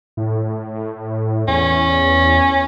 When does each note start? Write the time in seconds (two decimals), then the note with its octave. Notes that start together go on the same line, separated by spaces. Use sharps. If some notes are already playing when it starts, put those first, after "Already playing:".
0.17 A2
1.48 E2 C#4